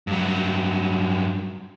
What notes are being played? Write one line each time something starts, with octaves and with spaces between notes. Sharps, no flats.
G2 F#3